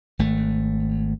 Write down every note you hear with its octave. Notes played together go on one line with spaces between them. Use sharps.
G#1 A3